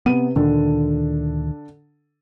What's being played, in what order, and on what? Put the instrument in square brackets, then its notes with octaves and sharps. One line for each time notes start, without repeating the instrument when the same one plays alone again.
[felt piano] C3 B4 D#7 [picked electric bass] B3
[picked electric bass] D2 A#2 D#3 [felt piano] D3 D4 A4